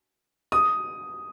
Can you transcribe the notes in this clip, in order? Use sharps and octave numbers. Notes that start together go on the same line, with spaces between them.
D#6